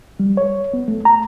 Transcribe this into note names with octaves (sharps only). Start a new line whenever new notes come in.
G3
C#5
B3
A3
A#5